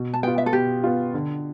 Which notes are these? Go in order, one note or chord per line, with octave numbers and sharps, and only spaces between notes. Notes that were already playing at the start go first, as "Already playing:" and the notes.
Already playing: B2
A5
B3 F4 G5
E5
A4
B2 G4
B3 F4
D3